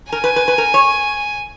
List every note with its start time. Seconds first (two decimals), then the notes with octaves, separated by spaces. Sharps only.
0.12 A#4 G#5
0.24 B4
0.36 B4
0.48 B4
0.58 A#4
0.74 C#5